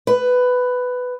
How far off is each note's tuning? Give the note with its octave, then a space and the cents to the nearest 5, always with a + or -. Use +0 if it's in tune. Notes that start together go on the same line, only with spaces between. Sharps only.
B4 +10